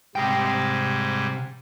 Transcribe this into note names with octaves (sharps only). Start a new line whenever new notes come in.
G#2 C3 G3 G#3 G5